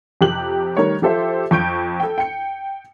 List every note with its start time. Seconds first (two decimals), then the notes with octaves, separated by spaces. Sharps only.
0.21 F2 C3 G4 F#6 F#7
0.77 D#3 G3 A3 A#4 C#5
1.02 F3 G4 A4 C5 E5
1.51 F2 C#6 G6 D7
2.00 A4 G5
2.18 G5 C#7